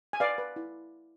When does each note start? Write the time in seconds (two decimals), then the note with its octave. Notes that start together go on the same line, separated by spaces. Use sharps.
0.13 G#5
0.20 B4 D5 F5
0.38 B4
0.56 E4